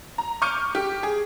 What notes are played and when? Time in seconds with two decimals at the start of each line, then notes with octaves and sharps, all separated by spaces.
0.18 A#5
0.42 C#6 D6 F6 G6 C#7 D#7
0.75 G4
1.03 G#4